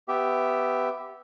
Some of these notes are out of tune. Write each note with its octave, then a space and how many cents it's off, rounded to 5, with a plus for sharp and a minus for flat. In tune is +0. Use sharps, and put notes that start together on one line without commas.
B3 +15 G4 +0 E5 +0